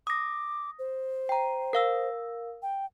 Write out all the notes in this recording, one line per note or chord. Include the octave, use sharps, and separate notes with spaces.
D6 D#6 A#6
C5
G5 A#5
A#4 F5 E6
G5